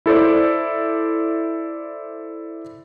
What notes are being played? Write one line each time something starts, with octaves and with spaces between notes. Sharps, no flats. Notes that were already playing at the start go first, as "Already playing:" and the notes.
E4 A4 C5 D5